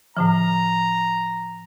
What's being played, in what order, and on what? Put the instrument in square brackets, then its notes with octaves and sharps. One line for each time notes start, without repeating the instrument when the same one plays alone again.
[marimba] A2 D3 F3 [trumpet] A#5